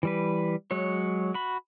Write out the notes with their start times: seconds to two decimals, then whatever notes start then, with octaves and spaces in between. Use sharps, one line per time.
0.03 E3 G3 B4
0.71 F#3 G#3 C#5
1.34 F#4 B5